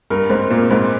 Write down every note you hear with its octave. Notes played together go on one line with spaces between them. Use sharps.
G2 A#4
G#2 C4
A#2 A#4
G#2 C4